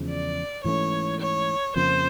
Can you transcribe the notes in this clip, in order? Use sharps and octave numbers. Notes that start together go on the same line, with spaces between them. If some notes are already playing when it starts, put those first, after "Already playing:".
Already playing: E2 C#3 F3 G#3
D5
G#2 E3 A3 C#4 C#5
C#5
F2 C#3 F3 A#3 C5